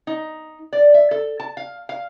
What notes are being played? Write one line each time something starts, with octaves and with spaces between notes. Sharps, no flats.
D#4
D5
E5
A4
A5
F5
F5